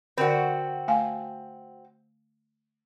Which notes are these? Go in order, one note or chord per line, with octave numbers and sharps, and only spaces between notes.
D3 C4 F#4 A#4 D5
A3 F5 G#5